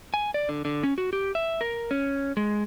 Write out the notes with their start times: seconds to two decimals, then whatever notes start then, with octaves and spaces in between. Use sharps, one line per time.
0.14 G#5
0.34 D5
0.49 D3
0.65 D3
0.83 C#4
0.98 F#4
1.13 G4
1.35 E5
1.61 A#4
1.91 C#4
2.37 G#3